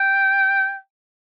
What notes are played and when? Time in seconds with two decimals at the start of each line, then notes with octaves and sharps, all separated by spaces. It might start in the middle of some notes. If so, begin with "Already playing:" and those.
Already playing: G5